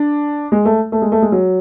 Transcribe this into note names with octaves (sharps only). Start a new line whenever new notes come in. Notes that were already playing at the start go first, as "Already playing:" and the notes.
Already playing: D4
G#3
A3
A3
G#3
A3
G#3
F#3